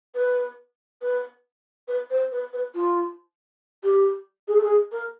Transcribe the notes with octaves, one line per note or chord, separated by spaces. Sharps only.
B4
B4
B4
C5
B4
B4
F4
G4
G#4
A4
G#4
A#4